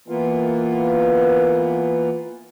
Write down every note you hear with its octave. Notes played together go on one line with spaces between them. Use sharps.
E3 A#3 B3 F4